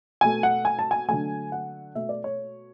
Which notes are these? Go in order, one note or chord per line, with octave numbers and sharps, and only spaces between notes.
B2 A3 G#5
F#5
G#5
A5
G#5
D3 F#3 A3 G#5
F#5
B2 A3 E5
D5
C#5